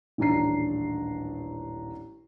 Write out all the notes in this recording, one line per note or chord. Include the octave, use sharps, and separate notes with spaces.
D#1 A1 D4 A#5 C7